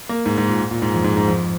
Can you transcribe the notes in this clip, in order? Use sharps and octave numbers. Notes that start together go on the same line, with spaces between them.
A#3
G#2
G#2
A#2
A#2
G#2
F2
G#2
G#2
F2